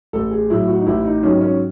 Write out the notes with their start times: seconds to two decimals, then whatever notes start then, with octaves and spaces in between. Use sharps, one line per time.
0.13 A1 A4
0.31 G#4
0.50 A2 F#3 E4
0.68 F#4
0.79 D#4
0.86 A1 E4
1.05 D#4
1.23 G#2 D#3 F#3 C#4
1.41 C#4